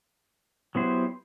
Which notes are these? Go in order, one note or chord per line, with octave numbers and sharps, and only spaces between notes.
F#3 B3 E4 G4 C5